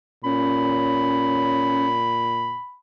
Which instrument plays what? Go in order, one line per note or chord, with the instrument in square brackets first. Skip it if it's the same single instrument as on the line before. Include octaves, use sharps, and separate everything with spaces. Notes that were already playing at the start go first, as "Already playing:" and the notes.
[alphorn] A#2 [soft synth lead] C#4 [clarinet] B5